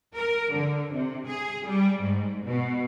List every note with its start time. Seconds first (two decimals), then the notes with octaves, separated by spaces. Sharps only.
0.16 A#4
0.53 D3
0.94 C3
1.27 G#4
1.67 G3
2.02 G#2
2.46 B2